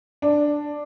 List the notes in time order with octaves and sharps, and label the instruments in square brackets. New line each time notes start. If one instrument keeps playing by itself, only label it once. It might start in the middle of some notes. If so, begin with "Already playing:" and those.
[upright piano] D4